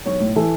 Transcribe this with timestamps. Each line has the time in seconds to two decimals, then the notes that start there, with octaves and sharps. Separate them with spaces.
0.05 B1 C#5
0.20 A2
0.36 E3 A4